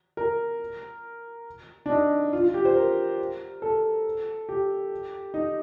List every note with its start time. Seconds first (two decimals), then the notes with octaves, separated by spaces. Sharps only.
0.17 A#4
1.86 D4
1.90 D#4
2.33 F4
2.44 F4
2.54 G4
2.65 C5
2.76 A#4
3.62 A4
4.49 G4
5.34 D#4